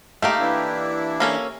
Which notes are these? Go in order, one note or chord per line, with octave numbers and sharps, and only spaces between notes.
A3 A#3 D#4 G4 F5
E3 D4 E4
A#3 C#4 A4